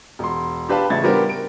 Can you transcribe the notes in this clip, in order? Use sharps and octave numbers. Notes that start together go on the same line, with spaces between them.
E1 C6
D4 G4 B4 F5 A5 B5
A1 C#3 E5 G#6 A6
G3 B3 D4 G4 A#4 C5
D7